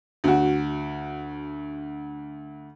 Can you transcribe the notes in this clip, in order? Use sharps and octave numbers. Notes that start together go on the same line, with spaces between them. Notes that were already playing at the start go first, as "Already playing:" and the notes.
D2 F#4